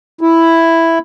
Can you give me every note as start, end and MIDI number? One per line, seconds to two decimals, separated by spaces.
0.21 0.99 64